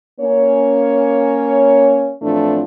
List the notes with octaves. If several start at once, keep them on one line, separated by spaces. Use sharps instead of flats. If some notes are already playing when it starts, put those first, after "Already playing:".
A#3 C#4 C#5
A2 E3 F3 A3 C4 D4